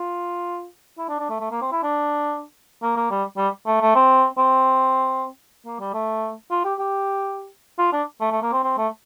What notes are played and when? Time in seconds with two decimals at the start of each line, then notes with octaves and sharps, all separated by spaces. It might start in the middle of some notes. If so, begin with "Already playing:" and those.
Already playing: F4
0.98 E4
1.09 D4
1.19 D4
1.30 A3
1.40 A3
1.51 A#3
1.62 C4
1.72 E4
1.83 D4
2.83 A#3
2.96 A#3
3.11 G3
3.37 G3
3.67 A3
3.82 A3
3.96 C4
4.38 C4
5.66 A#3
5.80 G3
5.94 A3
6.51 F4
6.65 G4
6.79 G4
7.78 F4
7.93 D4
8.21 A3
8.32 A3
8.42 A#3
8.53 C4
8.64 C4
8.78 A3